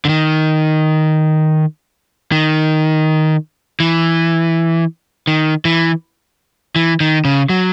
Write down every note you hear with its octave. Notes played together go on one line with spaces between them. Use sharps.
D3
D#3
D#3
E3
D#3
E3
E3
D#3
C#3
F#3